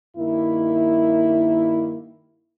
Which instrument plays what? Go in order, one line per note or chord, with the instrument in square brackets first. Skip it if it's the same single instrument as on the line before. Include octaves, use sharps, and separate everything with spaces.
[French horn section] G2 D#3 A#3 E4